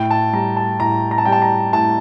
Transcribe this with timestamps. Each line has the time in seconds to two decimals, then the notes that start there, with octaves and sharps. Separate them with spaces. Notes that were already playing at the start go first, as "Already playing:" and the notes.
Already playing: A2 G5
0.11 A5
0.33 G3 A#5
0.57 A5
0.80 A2 A#5
1.11 A#5
1.18 A5
1.25 G3 G5
1.32 A5
1.42 A#5
1.73 A2 A5